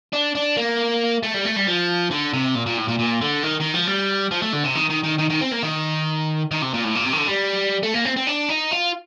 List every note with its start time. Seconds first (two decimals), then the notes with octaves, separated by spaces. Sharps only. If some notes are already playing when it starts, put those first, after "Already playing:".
0.13 D4
0.35 D4
0.57 A#3
1.23 A3
1.34 G3
1.45 A3
1.56 G3
1.67 F3
2.11 D3
2.33 C3
2.55 A#2
2.66 A#2
2.77 A2
2.88 A#2
2.99 A#2
3.21 D3
3.43 D#3
3.60 D#3
3.74 F3
3.87 G3
4.31 F3
4.42 A3
4.53 D3
4.64 C3
4.75 D#3
4.90 D#3
5.04 D#3
5.19 D#3
5.30 D#3
5.41 C4
5.52 A#3
5.63 D#3
6.51 D#3
6.62 C3
6.73 A#2
6.84 A2
6.95 A#2
7.06 C3
7.13 D#3
7.18 D3
7.28 G3
7.83 A3
7.94 A#3
8.05 C4
8.17 C4
8.27 D4
8.49 D#4
8.71 F4